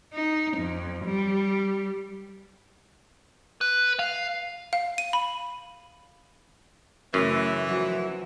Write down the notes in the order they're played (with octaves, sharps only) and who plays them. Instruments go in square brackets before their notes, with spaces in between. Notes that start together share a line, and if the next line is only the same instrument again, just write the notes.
[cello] D#4
F2
G3
[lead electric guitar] B4
F5
[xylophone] F5
D#7
B5
[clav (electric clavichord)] F#2 [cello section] C#3 A3 C#4 [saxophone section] E3
[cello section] F3 [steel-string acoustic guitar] F#3